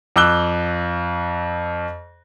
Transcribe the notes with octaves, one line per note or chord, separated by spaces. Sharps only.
F2 D6 E6 F#6 G7